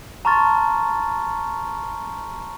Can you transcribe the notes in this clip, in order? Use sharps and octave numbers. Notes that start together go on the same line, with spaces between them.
A5 A#5 C6 C#6 F6 A6